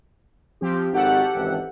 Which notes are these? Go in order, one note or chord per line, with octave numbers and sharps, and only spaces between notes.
F3 C4 G4
G#1 D#4 F#4 G4 A4 F#5
G#1 C#2 E3